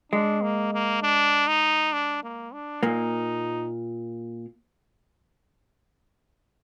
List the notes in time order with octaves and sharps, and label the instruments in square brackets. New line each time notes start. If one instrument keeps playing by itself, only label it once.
[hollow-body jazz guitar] G#3 [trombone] D4
[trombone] A#3
A#3
D4
D#4
D4
A#3
D4
[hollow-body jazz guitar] A#2 A#3 [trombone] D#4